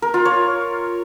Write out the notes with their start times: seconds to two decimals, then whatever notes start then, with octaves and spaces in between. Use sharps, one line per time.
0.02 A#4
0.14 F4
0.25 C#5